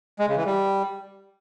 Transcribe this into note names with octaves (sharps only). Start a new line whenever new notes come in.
G#3
C#3
E3
G3